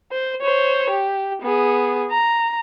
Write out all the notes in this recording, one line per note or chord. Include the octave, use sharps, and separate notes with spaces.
C5
C5 C#5
G4
B3 G#4
A#5